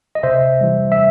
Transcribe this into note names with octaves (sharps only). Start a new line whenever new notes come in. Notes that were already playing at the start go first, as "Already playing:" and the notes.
D#5
C3 C5 E5
E3 G3
E5